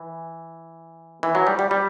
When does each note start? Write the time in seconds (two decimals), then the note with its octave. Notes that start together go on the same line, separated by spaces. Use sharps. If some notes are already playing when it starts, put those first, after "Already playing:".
Already playing: E3
1.23 E3
1.35 F#3
1.47 G3
1.59 G3
1.71 G3